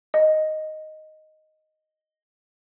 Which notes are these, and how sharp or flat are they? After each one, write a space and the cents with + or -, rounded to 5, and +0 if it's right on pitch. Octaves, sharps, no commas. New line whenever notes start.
D#5 +0